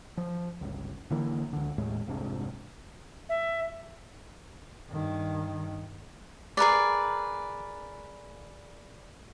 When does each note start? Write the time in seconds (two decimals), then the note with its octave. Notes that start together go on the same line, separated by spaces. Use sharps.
0.17 F3
0.61 G1 C#2
1.10 D3 E3 A#3
1.53 C#2 D3
1.78 D#2 A2 G#3
2.08 F1 C2 G#2 D4
3.29 E5
4.89 G2 D#3
6.57 G#4 A#4 B4 D5